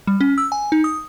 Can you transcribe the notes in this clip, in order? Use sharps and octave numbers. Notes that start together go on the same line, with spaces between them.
G3
C#4
E6
G#5
D#4
D#6